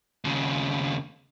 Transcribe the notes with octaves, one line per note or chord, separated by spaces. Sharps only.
D#2 C#3